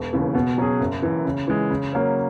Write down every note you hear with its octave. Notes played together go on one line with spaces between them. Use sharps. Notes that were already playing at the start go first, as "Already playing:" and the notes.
Already playing: E1
D#2 C#3 E3
B2
F#3 C#4 G#4
F#1
F#2 E3
C#3
E3 G#3
C#3
F#3 A#3 C#4